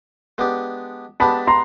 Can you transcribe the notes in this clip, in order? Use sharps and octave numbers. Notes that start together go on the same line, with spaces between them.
G#3 B3 D4 G4
G#3 B3 D4 G4 A5 B5
A#5 C6